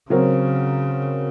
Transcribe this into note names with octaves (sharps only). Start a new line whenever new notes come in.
C#3 F#3 C4 F#4 A#4